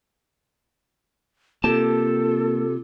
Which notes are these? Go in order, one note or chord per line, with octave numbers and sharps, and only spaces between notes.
C3 A#3 F4 G4 A4 A5